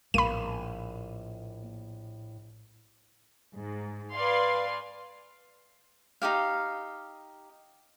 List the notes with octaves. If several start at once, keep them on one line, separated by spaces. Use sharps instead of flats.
A#1 A2 A#3 B5 D#7
G#2
B4 D5 F5 G#5 C6
D#4 E4 G4 F5